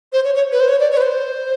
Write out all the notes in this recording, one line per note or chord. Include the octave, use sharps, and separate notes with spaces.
C5
C#5
C#5
B4
C5
C#5
D5
C#5
B4
C5